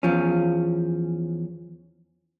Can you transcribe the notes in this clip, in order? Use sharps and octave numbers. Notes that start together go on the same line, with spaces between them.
E2 F3 C#4